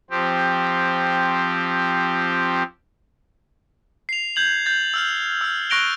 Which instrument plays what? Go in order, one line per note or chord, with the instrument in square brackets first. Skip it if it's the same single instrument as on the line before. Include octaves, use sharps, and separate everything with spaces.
[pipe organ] F3 C4 G4
[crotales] C7 F7
G6 G#6 F#7
G6 A6
E6 F6 G6
E6 F6
C#6 F#6 A#6 D7 F7 G7